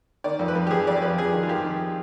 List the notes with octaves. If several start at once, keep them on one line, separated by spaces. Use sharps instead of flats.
D#3 D5
F2
B4
F2
G4
F2 G#4
F2 D5
F2 B4
F2 G#4
D#3
F4
F2 G4
D#3